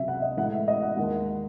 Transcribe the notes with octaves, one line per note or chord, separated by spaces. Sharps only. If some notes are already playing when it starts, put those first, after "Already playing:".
Already playing: C#2 C3 F#3 E5
F#5
D#5
A2 E3 G#3 F#5
E5
D#5
F#5
D#2 D#3 G#3 F#5